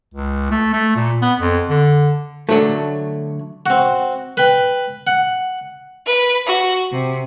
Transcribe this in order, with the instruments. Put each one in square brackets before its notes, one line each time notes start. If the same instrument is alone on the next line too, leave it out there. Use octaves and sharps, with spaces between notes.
[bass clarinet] C#2
A3
A3
A#2
B3
F2
D3
[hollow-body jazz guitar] D3 F#3 A3
[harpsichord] C4 F#4
B4 G5
F#5
[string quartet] B4
F#4
C3